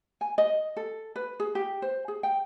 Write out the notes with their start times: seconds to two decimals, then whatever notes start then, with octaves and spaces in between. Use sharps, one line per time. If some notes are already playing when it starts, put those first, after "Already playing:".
0.21 G#5
0.38 D#5
0.77 A4
1.16 B4
1.40 G#4
1.55 G4
1.82 C5
2.08 G#4
2.23 G5